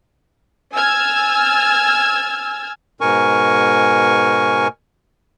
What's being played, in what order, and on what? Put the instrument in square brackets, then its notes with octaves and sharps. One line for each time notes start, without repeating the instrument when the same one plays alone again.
[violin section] G#5 E6 F6 G#6 A6
[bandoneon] G#2 B2 A#4 G#5 C#6